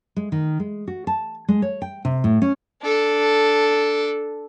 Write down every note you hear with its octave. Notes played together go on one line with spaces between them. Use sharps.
G#3
D#3
G#3
F#4
A5
G#3
C#5
G5
C3
A2
C#4
D4 A4